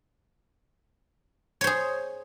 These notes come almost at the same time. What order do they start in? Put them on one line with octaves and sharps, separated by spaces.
C#5 C5 G#4